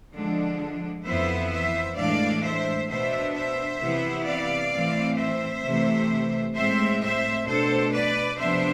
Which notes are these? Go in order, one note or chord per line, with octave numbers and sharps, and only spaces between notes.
D3 F3 G#3 D4
F2 E3 B3 E4 C5 E5
C5 E5
A2 E3 G#3 D4 D5 F5
C5 E5
B2 B3 D4 C5 E5
C5 E5
C3 E3 B3 E4
D5 F5
A2 E3 A3 C4
C5 E5
C3 E3 A3
A2 G#3 C4 C5 E5
C5 E5
B2 A3 D4 A4 C5
B4 D5
C3 F3 B3 D4 C5 E5